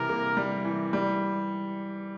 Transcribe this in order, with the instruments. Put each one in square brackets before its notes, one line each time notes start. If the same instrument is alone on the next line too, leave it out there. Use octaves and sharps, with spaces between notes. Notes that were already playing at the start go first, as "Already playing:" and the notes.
Already playing: [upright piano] C3 E3 G3 [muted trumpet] A#4
[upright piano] A#3
G3
E3
G3